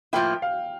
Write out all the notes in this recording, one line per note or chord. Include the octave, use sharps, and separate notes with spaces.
A2 F3 A#3 E4 G5
F5